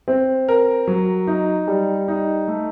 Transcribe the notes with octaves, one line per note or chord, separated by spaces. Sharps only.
C4
A#4
F#3
D#4
G3
D#4
A3